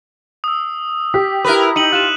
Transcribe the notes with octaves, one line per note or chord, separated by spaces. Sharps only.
D#6 E6
G4 B6
E4 A#4 B4
D#4 C#7 D#7 F#7
F4 F#6 D#7 E7